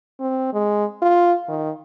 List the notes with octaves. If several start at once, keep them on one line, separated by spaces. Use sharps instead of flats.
C4
G#3
F4
D#3